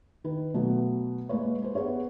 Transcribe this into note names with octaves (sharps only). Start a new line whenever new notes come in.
D#3 B4
B2 F#3 A3 B3
G#3 A#3 B4 C#5
B4 C5
B3 G#4 C#5